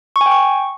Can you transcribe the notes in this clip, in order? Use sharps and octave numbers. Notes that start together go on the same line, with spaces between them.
C#6
G#5
G5
C#6